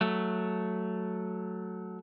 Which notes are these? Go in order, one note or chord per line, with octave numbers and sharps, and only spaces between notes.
F#3 A3